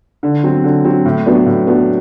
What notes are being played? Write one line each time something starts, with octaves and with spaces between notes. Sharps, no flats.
D3
F#3 C4
D3
F#3 C4
A2
F#3 B3 D4
A2
F#3 B3 D4